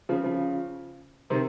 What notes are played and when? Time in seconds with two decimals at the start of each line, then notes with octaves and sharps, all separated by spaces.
0.09 C#3 F3
0.24 C#3 F3
1.30 C3 D#3